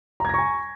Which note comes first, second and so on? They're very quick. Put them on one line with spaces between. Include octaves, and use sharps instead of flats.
A#5 G#6 A#6 C#6 G#5